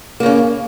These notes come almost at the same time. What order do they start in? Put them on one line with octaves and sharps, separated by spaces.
A#3 C#3 C#4